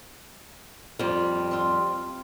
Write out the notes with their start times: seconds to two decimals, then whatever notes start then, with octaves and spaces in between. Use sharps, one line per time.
0.99 F2 G3 F4
1.51 C4 F4